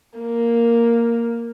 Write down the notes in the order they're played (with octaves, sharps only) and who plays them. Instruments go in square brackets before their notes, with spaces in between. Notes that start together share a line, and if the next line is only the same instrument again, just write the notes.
[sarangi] A#3